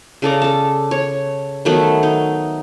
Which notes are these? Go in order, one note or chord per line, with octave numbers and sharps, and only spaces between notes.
C#3 A4 D5 A#5
A4 A5
C#5
D#3 F#3 A3 B3
D#4